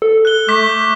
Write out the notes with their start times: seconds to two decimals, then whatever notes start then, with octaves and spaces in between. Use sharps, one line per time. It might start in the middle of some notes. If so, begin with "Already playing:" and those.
0.02 A4
0.25 F#6 G7
0.48 A3 D6 G6 B6